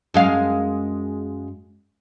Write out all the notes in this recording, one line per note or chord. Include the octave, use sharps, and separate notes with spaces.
F#2 G#3 F5